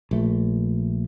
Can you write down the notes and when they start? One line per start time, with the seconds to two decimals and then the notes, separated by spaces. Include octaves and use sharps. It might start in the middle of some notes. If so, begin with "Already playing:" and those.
0.11 A#1 A3